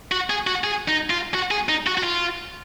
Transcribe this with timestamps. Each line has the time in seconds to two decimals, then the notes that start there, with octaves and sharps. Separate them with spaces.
0.12 F#4
0.30 G#4
0.47 F#4
0.64 G#4
0.88 D#4
1.10 F4
1.34 F#4
1.51 G#4
1.69 D#4
1.87 F#4
1.98 F#4
2.03 F4